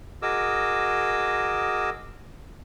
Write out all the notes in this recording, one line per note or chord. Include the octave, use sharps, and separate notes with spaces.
F#4 G#4 A#4 D#5 D6 E6